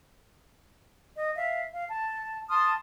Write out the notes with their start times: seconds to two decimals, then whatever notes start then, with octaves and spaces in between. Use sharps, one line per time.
1.15 D#5
1.35 E5 F5
1.72 F5
1.88 A5
2.49 A5 C6 D#6 F6